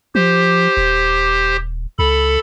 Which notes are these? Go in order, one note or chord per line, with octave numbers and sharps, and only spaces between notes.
F3 G4 C5
D#1
C#2 A4 B5